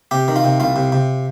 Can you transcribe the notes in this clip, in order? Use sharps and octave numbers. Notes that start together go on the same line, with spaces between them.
C3 G4
D#3
F4
C3
C2 F4
C3
C3